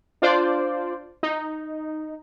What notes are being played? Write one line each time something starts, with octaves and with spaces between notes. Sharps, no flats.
D4 F4 C5 D5
D#4